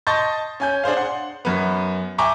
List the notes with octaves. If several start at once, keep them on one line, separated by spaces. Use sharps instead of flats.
D#5 A5 C6 C#6 G6 A6
C#4 G#5 G6
D4 G#4 C5 F5
F#5 C6
F#2 B3
E5 G5 G#5 A#5 C#6 D6